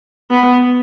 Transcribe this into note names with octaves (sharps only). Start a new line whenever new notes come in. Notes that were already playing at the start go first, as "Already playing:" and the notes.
B3